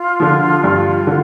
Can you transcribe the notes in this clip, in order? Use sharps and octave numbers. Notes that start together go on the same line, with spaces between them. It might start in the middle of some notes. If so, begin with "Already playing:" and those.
Already playing: F4
D3 F3
G2
D3